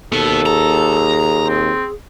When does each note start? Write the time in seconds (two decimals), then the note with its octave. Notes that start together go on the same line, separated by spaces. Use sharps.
0.13 D#2 B2 B3 A4
0.46 G#4 A#5
1.46 C4